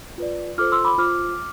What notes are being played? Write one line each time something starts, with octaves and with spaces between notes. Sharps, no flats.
F4 B4 D5
F4 A4 C5 D6 F6
C6 E6
B5 D6
F4 C5 D6 F6